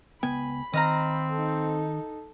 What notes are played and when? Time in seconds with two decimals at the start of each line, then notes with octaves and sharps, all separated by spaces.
0.23 C#2 B3 G5 G#5 B5
0.73 D#3 C4 D#5 F5 A#5
1.32 D#4 A4